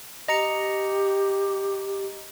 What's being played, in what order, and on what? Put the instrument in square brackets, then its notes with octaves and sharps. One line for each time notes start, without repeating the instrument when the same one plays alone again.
[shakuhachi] G4 [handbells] D#5 A#5 C#7